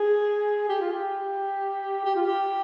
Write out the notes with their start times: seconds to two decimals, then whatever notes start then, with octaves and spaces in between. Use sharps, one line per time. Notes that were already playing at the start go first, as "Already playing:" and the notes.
Already playing: G#4
0.69 G4
0.80 F4
0.92 G4
2.04 G4
2.15 F4
2.26 G4